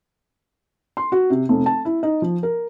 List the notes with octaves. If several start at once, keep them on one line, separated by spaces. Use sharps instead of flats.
C6
F#4
C3
F1
A5
E4
D#4
F3
A#4